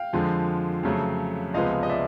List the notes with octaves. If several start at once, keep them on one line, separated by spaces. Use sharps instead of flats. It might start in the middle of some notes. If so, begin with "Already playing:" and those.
Already playing: F5 G5
F2 D3 F3 G#3
F2 C#3 F#3 A3
C#2 C3 F3 G#3 B3 D#5 F5
D#5
D5 E5